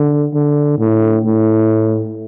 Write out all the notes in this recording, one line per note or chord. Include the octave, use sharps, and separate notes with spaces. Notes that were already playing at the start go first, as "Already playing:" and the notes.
Already playing: D3
D3
A2
A2